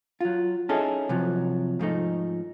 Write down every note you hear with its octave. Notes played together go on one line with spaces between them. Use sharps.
F#3 F4
C#4 D#4 E4 G#4 A4
C3 F3 F#3
G#2 F3 A3 D#4